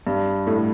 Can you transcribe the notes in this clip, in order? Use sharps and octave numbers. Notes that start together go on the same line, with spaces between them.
G2
A2